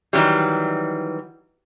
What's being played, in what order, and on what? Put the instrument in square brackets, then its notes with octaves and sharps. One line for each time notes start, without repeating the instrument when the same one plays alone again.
[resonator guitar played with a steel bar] D#3 E3 F#3 G3